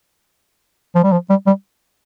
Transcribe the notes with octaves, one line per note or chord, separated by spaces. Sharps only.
F3
G3
F3
G3
G3